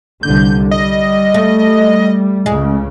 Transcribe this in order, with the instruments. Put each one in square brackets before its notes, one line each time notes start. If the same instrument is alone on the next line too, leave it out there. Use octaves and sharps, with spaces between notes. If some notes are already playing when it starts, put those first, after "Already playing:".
[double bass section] C2 D3 [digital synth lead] G6
[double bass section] G3 [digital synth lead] D#5
[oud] A3
[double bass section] C#2 C#3 [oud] G#3